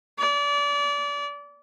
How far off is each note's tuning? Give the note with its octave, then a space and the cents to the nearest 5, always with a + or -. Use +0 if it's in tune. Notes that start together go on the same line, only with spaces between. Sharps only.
D5 -30